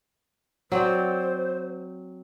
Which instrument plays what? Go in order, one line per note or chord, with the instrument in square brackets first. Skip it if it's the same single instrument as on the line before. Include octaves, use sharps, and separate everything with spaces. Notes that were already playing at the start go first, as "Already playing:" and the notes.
[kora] F#3 C4 D5 [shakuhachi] C5